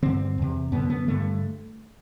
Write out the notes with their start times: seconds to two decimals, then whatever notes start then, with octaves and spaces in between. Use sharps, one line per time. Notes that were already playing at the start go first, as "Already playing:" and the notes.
0.02 G2 D3 C4
0.38 E2 C3
0.72 F#2 D3 B3
0.90 B3
1.07 G2 D3 A3